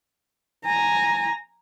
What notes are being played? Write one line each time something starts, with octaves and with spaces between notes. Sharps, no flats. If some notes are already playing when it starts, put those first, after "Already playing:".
G#5 A#5